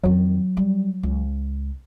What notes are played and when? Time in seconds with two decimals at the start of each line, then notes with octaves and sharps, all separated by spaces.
0.03 F2 D#3 F#3
0.57 G3
1.03 C#2